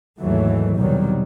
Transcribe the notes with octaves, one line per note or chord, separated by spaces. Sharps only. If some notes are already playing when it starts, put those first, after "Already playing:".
D#2 G#2 E3 F#3 A3
B1 E2 C3 D#3 F#3 G3